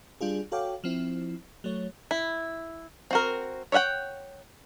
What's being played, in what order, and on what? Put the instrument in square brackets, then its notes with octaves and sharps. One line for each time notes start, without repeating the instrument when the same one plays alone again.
[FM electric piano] G3 D4 F4 G#4
F#4 A4 C#5 F5 G5 D6
F3 C4 E4
F#3 A3 C#5
[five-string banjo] E4
C4 F#4 A#4
C#5 D#5 E5 F#5 G5